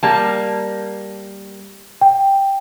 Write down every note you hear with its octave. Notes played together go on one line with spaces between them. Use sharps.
G3 A#3 A5
G5